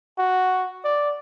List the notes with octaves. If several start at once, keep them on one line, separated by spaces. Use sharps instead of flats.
F#4
D5